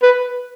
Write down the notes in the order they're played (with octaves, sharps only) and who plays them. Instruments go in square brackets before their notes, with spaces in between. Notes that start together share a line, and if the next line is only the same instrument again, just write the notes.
[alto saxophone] B4